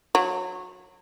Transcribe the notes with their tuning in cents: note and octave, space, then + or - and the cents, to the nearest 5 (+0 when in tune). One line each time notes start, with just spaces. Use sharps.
F#3 -25